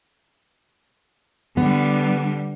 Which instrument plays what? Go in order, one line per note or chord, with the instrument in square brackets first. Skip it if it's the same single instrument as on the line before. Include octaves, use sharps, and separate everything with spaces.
[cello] D3 G3 [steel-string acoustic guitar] B3